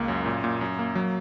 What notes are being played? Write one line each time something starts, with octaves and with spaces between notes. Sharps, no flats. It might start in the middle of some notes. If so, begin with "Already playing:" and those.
Already playing: C#2 A#3
F#2
A#2
A#2
F#2
A#3
F#3